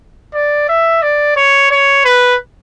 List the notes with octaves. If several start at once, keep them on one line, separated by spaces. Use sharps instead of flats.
D5
E5
D5
C#5
C#5
B4